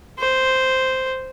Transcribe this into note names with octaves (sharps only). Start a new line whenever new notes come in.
C5